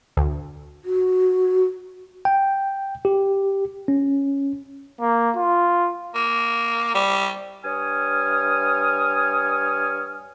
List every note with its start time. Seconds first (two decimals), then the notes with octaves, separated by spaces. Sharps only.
0.17 D2
0.85 F#4
2.25 G5
3.05 G4
3.88 C#4
5.01 A#3
5.36 F4
6.15 A#3
6.95 G3
7.64 G2 C#5 G#5 D#6 F6